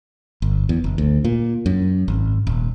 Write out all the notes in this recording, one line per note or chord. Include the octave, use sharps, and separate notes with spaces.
G1
E2
F#1
D2
A#2
F#2
G#1
D#1